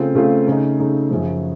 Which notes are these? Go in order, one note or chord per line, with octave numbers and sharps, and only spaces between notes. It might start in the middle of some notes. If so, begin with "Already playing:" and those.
Already playing: C#3 A3 C4 F4
C#3 A3 C4 F4
C#3 A3 D#4
C#3 A3 D#4
F#2 C#3 F3